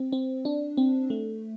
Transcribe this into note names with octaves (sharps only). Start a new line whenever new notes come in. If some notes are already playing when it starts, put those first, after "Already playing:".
Already playing: C4
C4
D4
C4
A3